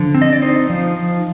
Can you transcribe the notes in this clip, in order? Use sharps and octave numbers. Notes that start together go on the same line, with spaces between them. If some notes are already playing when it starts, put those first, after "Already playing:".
Already playing: D3 F3
C4
D#5
D5
D#4 C5
F3